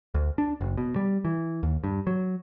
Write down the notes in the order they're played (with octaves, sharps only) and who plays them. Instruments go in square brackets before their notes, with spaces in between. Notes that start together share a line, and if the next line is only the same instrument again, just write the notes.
[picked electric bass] D2
D4
F#1
B2
G3
E3
D#2
G2
F#3